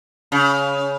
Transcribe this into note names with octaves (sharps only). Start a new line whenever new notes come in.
C#3